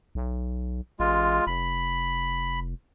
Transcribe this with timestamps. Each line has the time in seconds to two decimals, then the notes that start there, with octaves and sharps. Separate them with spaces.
0.15 B1
1.00 A1 G#3 F4
1.47 F1 B5